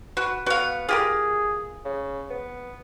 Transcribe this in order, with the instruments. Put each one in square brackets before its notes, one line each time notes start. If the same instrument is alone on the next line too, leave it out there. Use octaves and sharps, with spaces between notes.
[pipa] F#4 [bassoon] B4
[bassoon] B3 [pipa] F#4 F5
[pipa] F4 G4 A#4 [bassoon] G#4
[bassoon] C#3
B3